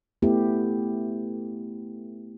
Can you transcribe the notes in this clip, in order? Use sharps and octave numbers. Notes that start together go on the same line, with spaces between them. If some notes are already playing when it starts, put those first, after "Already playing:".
A3 B3 E4 G4